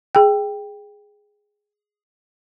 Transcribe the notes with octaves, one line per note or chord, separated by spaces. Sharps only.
G#4 G5